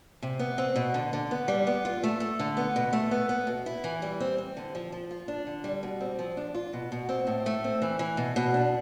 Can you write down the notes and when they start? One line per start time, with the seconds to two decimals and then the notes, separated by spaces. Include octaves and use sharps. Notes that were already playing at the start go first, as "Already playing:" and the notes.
0.23 C3
0.39 B3
0.58 C4
0.76 B2
0.94 D3
1.13 D3
1.31 B3
1.48 G3
1.67 B3
1.85 F4
2.03 A3
2.20 A3
2.39 D3
2.57 B3
2.76 B2
2.93 A3
3.11 B3
3.29 B3
3.47 B2
3.66 E4
3.84 E3
4.02 G3
4.20 C4
4.38 C4
4.57 D3
4.75 F3
4.92 F3
5.11 F4
5.28 D4
5.47 D3
5.64 G3
5.83 B2
6.01 C4
6.19 F3
6.37 D4
6.54 F4
6.73 B2
6.92 B2
7.09 C4
7.27 A2
7.46 A3
7.64 C4
7.82 E3
7.99 E3
8.17 B2
8.36 B2
8.54 D4